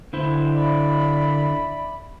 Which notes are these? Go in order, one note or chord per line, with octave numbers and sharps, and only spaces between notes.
D3 E4 C5
D5 E5 B5